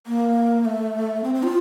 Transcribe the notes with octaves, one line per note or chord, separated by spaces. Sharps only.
A#3
A3
C4
C4
F4